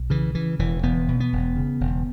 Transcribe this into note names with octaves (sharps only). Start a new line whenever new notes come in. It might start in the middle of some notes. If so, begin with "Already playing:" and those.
Already playing: B1
C#3 E3
C#3 E3
E1 E3
E1 B3
B2
B3
E1
C#3
E1